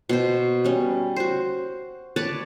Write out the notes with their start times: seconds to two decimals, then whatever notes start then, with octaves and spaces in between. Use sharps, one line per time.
0.09 B2 C5
0.64 G3 C#4
1.16 F#4 C5
2.16 B4 C#5 D5 A5